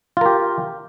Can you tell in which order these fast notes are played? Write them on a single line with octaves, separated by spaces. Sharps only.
F4 A#4 G4